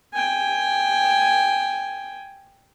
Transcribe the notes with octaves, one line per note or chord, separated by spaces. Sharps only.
G5 G#5